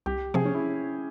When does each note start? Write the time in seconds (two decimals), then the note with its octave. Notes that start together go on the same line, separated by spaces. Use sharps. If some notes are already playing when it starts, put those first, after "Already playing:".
0.06 C2 G4
0.34 C3 F3 C4 G#4
0.45 C#4
0.54 E4